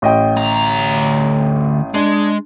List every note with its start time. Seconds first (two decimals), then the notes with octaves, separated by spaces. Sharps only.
0.02 A1 D#5 G5
0.37 D2 A#5
1.94 G#3 D4